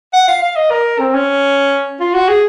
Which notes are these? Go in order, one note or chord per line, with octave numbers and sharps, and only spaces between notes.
F#5
F5
F5
D#5
A#4
C4
C#4
F4
F#4
G#4